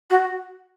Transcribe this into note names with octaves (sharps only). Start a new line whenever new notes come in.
F#4